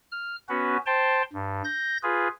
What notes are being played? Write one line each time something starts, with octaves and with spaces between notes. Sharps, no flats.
F6
B3 C#4 F#4 B4
C5 G5 A5 C6
G2
G6 A#6
F4 G#4 B4